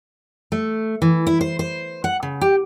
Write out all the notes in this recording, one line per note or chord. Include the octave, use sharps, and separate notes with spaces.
A3
E3
E4
C5
C5
F#5
C#3
G4